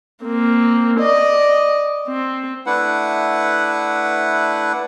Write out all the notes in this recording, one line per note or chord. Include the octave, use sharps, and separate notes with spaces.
A#3 C4
D5 D#5
C4
A3 D4 E4 B4 F#5